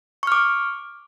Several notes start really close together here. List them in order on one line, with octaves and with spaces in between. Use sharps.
C#6 F6 D6